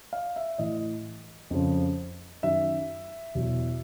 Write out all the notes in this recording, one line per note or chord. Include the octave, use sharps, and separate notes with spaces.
F5
E5
A2 E3 D#5
F2 C#3 F3
F#2 D#3 F#3 E5
E2 B2 F#3